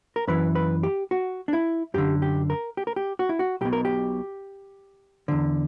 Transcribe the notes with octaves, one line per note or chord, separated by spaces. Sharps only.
A#4
F#2 E3 B4
B4
G4
F#4
D4
E4
F#2 D3 G4
G4
A#4
G4
A#4
G4
F#4
E4
F#4
B1 B2 G4
A#4
G4
E2 D3